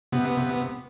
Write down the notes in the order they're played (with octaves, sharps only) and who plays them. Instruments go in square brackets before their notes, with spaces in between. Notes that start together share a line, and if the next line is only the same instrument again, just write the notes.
[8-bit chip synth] C3 B3